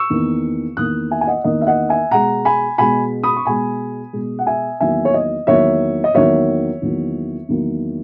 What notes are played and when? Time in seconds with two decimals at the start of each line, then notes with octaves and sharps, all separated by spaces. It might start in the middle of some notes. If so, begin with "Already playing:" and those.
Already playing: C#6 E6
0.10 E2 D#3 A#3
0.77 E2 D#3 A#3 D#6 F#6
1.11 E5 G#5
1.21 G#5
1.27 D#5 F#5
1.44 E2 D#3 A#3 D#5
1.61 E5
1.67 D#5 F#5
1.89 E5 G#5
2.11 B2 G#3 F#5 A#5
2.45 G#5 B5
2.78 B2 G#3 G#5 B5
3.23 B5 D#6
3.37 C#6
3.45 B2 G#3 G#5 B5
4.13 B2 G#3
4.39 F#5
4.47 E5 G#5
4.80 E2 D#3 F#3 A#3 E5 G#5
5.05 C#5
5.14 D#5
5.47 E2 D#3 F#3 A#3 C#5 E5
6.04 D#5
6.15 E2 D#3 F#3 A#3 C#5 E5
6.82 E2 D#3 F#3 A#3
7.48 E2 D#3 F#3 A#3